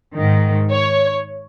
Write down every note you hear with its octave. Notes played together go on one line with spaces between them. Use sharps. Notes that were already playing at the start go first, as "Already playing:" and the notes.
G#2 D#3
C#5